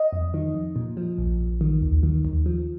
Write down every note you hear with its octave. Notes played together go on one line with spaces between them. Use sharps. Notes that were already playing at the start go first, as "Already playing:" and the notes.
Already playing: D#5
F2
D#3
F2
A#2
F3
A#1
A#1
D#3
D#2
D#3
D#2
F3